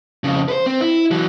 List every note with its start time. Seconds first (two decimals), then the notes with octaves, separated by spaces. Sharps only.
0.24 F2 C#3
0.49 B4 C5
0.66 C4
0.81 E4
1.11 E3 F#3